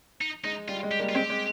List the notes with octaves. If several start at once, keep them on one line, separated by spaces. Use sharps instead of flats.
D#4
G#3 D#4
G3 F4
G#3
G4
G3 A#3
F4
G#3 C4 G4
G#3